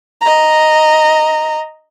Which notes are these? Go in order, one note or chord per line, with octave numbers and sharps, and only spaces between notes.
D#5 A#5